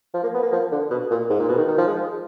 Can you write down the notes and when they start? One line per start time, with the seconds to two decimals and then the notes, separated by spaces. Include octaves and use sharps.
0.14 F3
0.24 A#3
0.34 B3
0.43 A#3
0.52 F3
0.72 D3
0.91 B2
1.11 A#2
1.30 G#2
1.40 A#2
1.49 B2
1.58 D#3
1.68 D#3
1.78 F3
1.87 G#3